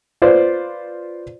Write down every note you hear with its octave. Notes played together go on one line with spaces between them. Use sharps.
F4 B4 C5 D5